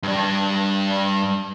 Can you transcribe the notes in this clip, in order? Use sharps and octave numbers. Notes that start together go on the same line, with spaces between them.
G2 D4